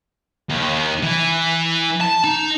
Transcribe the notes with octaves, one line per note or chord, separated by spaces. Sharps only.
D#2
E3
A5
D#4